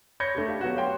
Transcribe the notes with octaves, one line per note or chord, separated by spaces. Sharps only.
C#5 B5 G6 G#6 A#6 C#7
A3 D4 G4
G4 F5
F#3 B3 F#4
G4 C#5 F5 G5 C6